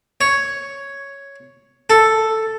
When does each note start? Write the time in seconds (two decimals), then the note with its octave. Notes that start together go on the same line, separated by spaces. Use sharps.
0.21 C#5
1.90 A4